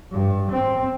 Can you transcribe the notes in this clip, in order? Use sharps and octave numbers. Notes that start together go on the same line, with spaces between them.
G2
C4